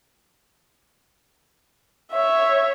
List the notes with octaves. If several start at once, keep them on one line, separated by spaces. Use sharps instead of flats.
C#5 E5